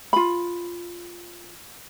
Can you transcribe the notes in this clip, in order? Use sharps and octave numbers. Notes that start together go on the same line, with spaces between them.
F4 B5